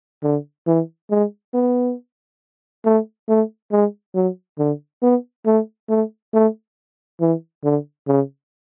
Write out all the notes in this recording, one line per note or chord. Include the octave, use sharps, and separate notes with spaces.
D3
E3
G#3
B3
A3
A3
G#3
F#3
D3
B3
A3
A3
A3
E3
D3
C#3